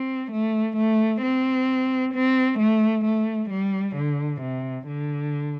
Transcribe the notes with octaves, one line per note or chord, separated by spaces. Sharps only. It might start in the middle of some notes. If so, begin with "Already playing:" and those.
Already playing: C4
A3
A3
C4
C4
A3
A3
G3
D3
C3
D3